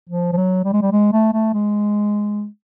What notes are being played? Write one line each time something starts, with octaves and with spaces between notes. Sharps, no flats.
F3
F3
F#3
G3
G#3
G3
G#3
A3
A3
G#3